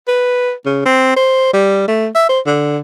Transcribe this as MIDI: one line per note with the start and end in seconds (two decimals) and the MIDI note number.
0.08 0.52 71
0.65 0.84 49
0.85 1.15 60
1.17 1.53 72
1.54 1.85 55
1.88 2.08 57
2.15 2.27 76
2.29 2.40 72
2.47 2.79 50